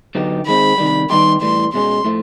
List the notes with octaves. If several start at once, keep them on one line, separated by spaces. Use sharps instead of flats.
D3 F#3 B3 D#4 G4
D#3 G#3 C4 B5
C3 D#3 G3
D#3 G3 B3 D#4 G4 C6
A2 E3 G3 C6
B2 G#3 C#4 C6
A2 F3 A3